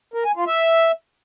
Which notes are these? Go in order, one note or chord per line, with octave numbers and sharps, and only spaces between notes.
A#4
G#5
F4
E5